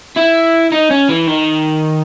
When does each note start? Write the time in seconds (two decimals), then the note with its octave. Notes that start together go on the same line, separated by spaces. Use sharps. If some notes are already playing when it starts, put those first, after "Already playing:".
0.16 E4
0.72 D#4
0.91 C#4
1.09 E3
1.27 D#3